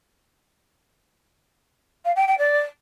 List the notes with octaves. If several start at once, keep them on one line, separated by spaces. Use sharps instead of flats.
F5
G5
G5
D5